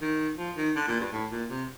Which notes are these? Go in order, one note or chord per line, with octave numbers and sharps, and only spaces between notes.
D#3
F3
D#3
D3
A#2
G2
A2
A#2
C3